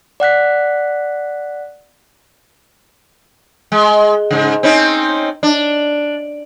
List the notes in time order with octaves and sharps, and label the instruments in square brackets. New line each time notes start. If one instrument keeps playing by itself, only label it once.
[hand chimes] D5 F#5 F#6 B6
[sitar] G#3
G#2 C#3
C4 C#4 D#4
D4